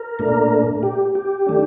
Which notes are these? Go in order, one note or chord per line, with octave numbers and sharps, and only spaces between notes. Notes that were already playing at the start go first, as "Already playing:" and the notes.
Already playing: A#4
A#2 A3 D4
G4
G4
D#3 A3 D4